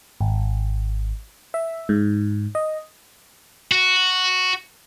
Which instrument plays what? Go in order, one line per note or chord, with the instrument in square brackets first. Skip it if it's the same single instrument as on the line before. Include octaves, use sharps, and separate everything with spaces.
[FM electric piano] G#1
E5
G#2
D#5
[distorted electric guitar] F#4